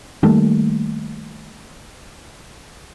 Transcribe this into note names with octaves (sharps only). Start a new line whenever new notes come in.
D#3 G3 A3 A#3